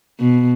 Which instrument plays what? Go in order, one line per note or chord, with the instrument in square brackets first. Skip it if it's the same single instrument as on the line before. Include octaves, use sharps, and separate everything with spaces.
[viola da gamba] B2